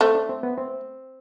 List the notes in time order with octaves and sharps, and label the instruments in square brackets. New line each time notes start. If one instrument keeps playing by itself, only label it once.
[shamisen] A3 [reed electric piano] C4
[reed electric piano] D4
C4
B3
C4